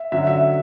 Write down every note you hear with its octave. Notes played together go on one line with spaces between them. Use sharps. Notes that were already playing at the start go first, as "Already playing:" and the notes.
Already playing: E5
D3 F#3 C#4 F#4 E5
E5